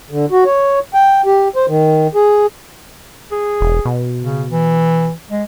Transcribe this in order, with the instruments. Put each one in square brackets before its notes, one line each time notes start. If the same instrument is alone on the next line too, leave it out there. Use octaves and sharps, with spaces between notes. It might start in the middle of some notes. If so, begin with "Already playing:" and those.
[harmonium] D3
F#4
C#5
G5
G4
C5
D#3
G#4
[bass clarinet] G#4
[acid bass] E1
B2
[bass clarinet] C#3
E3
G#3